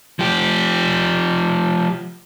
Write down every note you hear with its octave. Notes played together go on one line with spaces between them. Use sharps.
F3 G4